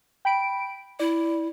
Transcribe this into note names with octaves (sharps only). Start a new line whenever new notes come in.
G5 B5 D7
E4 D5